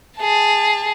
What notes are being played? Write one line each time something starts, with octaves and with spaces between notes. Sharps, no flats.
G#4 A5